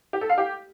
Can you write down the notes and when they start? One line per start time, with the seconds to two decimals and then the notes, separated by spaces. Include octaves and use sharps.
0.13 G4
0.21 A4
0.30 F5
0.38 G4